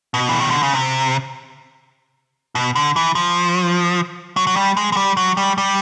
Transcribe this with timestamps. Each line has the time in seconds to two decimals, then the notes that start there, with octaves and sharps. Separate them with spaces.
0.14 B2
0.29 E3
0.40 D#3
0.51 D3
0.63 C#3
0.74 C3
2.55 B2
2.76 D3
2.96 E3
3.15 F3
4.37 F#3
4.47 F#3
4.56 G3
4.77 G#3
4.92 G#3
4.97 G3
5.17 F#3
5.37 G3
5.58 G3